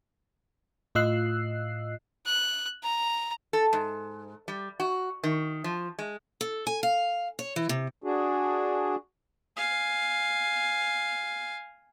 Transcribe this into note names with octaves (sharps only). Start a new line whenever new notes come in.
A2 F4 D#5 E6 F#6 C7
F#6
A#5
A4
G#2
G3
F#4
D#3
F3
G#3
A4
G#5
F5
C#5
E3
C3
D4 F#4 G#4
F5 G#5